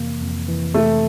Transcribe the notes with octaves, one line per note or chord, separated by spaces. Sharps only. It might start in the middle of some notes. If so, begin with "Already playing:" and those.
Already playing: F2 C3 E3 A#3
F2
E3
C3 A3